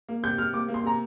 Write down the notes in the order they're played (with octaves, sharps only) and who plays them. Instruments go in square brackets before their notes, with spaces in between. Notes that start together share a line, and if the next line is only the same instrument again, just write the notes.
[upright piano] A#3
C3 G6
C3 F6
A#3 D6
A#3
C6
C3 A#5